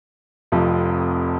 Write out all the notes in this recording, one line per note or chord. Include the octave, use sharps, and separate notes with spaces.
F1 F2 C3 F3